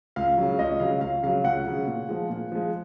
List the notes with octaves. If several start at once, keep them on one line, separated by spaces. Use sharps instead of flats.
C#2 F5
C#3 F#3
C#2 D#5
C#3 F#3 F5
C#2 F5
C#3 F#3 F5
C#2 F#5
C#3 F#3
A#2
F3 G#3
A#2
F3 G#3